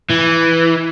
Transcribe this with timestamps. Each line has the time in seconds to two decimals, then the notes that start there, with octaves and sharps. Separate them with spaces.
0.10 E3